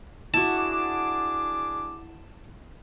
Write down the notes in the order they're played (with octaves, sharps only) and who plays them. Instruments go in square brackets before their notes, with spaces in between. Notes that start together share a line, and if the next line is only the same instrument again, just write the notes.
[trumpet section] D4 G#4 D6 [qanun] E4 F#4 [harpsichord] A5